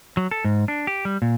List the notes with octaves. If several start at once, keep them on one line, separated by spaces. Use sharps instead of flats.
F#3
A4
G#2
D4
G4
G3
A#2